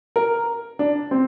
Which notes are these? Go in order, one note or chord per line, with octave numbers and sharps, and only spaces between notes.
A#4
D4
C4